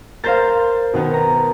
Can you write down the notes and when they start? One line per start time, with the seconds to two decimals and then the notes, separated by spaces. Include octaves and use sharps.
0.24 A#4 C5 F5 G6 A6
0.93 B2 D#3 B3
1.14 A#5